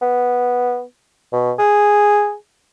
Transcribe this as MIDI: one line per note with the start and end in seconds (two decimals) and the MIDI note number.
0.02 0.82 59
1.33 1.53 47
1.59 2.35 68